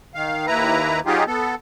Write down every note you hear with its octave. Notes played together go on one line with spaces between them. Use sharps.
D#3 F5
D#2 E4 B4 A#5
F#3 D#4 F4 G4 G#4
B3 A4